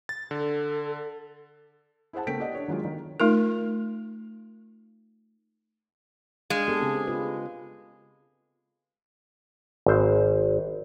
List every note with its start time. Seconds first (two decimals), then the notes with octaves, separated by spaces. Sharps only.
0.09 A6
0.31 D3 A4
2.13 E4 G#4 C5 F#5 A5
2.27 C#3 A3 A#4 G5 B6 D7
2.40 G4 D5 D#5 F#5
2.54 D4 C#5
2.68 D#3 F#3 G#3 F4
2.85 D#3
3.20 A3 D#4 F4 A#4
6.50 G#3 D4 F5
6.68 B3 G4 A4
6.81 C#3 C4 G#4
7.07 F4 B4
9.86 G#1 C5